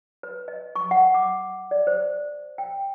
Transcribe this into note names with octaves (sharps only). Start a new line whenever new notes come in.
B4
D#5
C#6
F#5
D6
D5
C5
G5